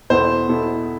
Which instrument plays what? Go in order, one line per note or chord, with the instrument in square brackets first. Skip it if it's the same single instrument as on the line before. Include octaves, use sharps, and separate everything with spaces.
[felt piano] E2 B2 B3 E4 A4 [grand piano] C5
[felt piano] B2 B3 E4 A4